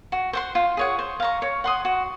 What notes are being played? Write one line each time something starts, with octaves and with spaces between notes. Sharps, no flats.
F#4
C5 F#5 C6
F4
G#4 C#5 F#5
C5
F5 A#5 C#6
C#5
F#5 C6 D#6
F#4